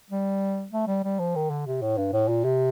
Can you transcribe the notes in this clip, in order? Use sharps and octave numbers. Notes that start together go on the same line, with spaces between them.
G3
A3
G3
G3
F3
D#3
D3
C3
A2
G2
A2
A#2
C3